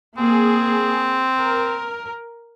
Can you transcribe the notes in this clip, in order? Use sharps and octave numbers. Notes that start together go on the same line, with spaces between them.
A#3 C4 G#4
A#4